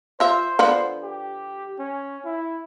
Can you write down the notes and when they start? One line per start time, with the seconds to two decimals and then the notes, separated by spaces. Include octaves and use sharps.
0.20 F4 C5 E5
0.59 D3 F3 B3
1.03 G4
1.79 C#4
2.25 E4